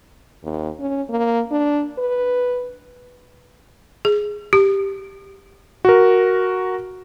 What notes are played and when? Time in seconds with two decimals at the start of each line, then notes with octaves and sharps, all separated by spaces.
0.44 D#2
0.80 C#4
1.10 A#3
1.51 D4
1.98 B4
4.05 G#4
4.53 G4
5.85 F#4 A#4